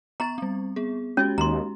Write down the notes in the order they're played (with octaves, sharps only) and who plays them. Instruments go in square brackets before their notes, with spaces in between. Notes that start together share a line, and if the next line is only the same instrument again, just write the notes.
[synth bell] B3 C#6 A6 [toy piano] A#5
[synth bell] G3 C4
B3 G#4
[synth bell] G#3 F#4 G4 [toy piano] C#4
[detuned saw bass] D#2 [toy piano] A#5 C6